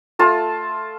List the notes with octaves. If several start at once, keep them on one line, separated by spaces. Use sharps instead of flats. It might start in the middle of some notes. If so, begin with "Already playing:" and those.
A3 F4 A5